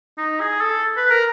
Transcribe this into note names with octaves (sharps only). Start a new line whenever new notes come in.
D#4
G#4
A4
B4
A#4